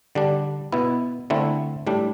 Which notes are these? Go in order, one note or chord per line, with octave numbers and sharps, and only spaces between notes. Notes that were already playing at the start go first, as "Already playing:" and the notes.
D3 G3 D4
B2 B3 E4
D3 A3 C4 E4
A2 G3 D4